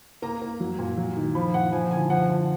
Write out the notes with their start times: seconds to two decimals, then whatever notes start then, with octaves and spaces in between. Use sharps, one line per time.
0.22 A#3 A#5
0.42 A#3
0.60 F#3
0.79 A#2
0.97 F#3
1.17 D#3
1.35 F3 B5
1.54 A#2 F#5
1.72 F3 G#5
1.91 D3 G#5
2.10 F3 F#5
2.29 D3